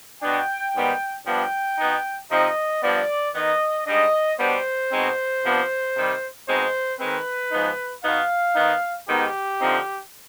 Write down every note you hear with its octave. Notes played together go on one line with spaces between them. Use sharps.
B2 B3 D4 G5
G#2 D#3 G3 B3
G2 F3 B3 D4 G5
B2 B3 D#4
C3 F3 C4 D#4 D#5
G2 F3 B3 D5
D#3 B3 D#4 D#5
G#2 G3 D4 D#5
B2 G3 B3 D4 C5
B2 G#3 C4 D#4
C3 F3 B3 D4
C3 D#3 G3
B2 G#3 C4 D#4 C5
D#3 G#3 C4 B4
G#2 F3 B3 D#4
B2 B3 D#4 F5
D#3 B3 D#4
G#2 D#3 B3 D#4 G4
D3 F3 C4 D#4